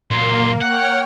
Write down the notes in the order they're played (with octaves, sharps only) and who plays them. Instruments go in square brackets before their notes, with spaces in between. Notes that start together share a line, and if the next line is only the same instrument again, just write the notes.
[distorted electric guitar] A#2 F#3 [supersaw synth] A#3 [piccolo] C6
[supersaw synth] C#5 G5 F6 [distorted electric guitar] F#5 [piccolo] F#6